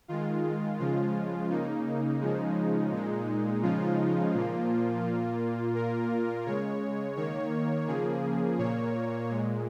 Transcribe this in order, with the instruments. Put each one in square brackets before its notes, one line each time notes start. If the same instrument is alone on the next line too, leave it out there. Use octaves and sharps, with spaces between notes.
[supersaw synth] D#3 G#3 F4
C#3 F3 G#3 F4
C#3 A#3 D#4
C#3 F3 G#3
A#2 G#3
C#3 F3 G#3 F4
A#2 F3 A#3
A#2 A#3
A#2 A#3 A#4
C#3 G#3 C#5
D#3 A#3 C#5
C#3 F3 A#3 G#4
A#2 A#3 C#5
A#2 G#3